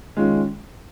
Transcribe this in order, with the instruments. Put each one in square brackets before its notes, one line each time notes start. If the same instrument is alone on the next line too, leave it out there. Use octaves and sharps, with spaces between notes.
[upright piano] D#3 G#3 C#4 F4